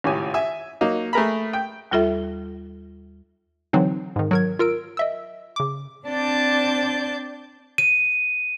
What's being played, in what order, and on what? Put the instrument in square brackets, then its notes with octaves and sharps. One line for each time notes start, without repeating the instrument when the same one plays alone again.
[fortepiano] G#1 C#2 A2 G4 G#5
E5 G#5
F#3 A#3 D#4
A3 G#4 A#4 A#5 B5
G5
[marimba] D#2 G3 F4 A4 E5
[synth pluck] D3 E3 F#3 C4 D#4
G#2 D#3
F#3 A#4 G#6
F4 A#4 E6 D7
D#5 E5 E6
C#3 D6
[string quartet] C4 D4 D5 A5 G6
[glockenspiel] D#7